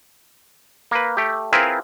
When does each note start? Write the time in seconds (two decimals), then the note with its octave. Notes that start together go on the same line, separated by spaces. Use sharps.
0.91 A#3 B4
1.17 A3 G4
1.53 C4 E4 F4 G#4 A#4 B4